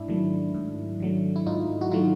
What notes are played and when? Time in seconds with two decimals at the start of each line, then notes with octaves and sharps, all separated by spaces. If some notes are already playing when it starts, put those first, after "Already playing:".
Already playing: G#2 D4 E4
0.08 D#3 F#3 A3
0.54 G#2
1.00 D#3 F#3 A3
1.36 E4
1.46 G#2 D#4 F4
1.81 F#4
1.91 D#3 F#3 A3 D#4 F4